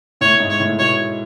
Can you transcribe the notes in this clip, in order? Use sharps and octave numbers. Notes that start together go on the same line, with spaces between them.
A2 C#5
G#2
C#5
A2
B2 C#5